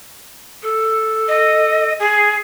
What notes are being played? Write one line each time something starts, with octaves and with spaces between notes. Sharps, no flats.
A4
D#5
G#4